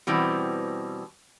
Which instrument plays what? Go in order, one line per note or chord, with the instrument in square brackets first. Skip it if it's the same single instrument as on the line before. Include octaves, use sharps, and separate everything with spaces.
[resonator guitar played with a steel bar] B2 E3 G3 C4